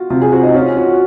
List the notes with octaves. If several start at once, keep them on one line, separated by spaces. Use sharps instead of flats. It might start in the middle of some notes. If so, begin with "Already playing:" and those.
Already playing: F4 F#4
C3 F4
G#4
C4 F#4
D#4
C#4 F4
F#4